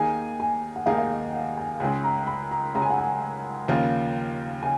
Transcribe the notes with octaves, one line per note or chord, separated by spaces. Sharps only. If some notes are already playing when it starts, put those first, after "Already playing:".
Already playing: D#2 D#3 A#3 D#4 G#4 G#5
G#5
F#5
D#2 D#3 A#3 D#4 G#4 F5
F5
D#5
F#5
G#5
C#2 C#3 G#3 G#5
A#5
B5
A#5
C#2 C#3 G#3 A#5
G#5
F#5
G#5
D#2 C#3 F3 A#3 F4
C#3 G#5